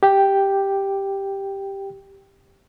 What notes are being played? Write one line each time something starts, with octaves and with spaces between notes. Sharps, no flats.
G4 G5